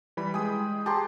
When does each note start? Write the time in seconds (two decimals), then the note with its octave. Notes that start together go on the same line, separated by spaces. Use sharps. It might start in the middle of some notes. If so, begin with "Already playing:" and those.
0.17 E3 G3 B5
0.34 G#3 G#4 G5 D#6
0.86 G4 G#4 B4 A5 A#5 C6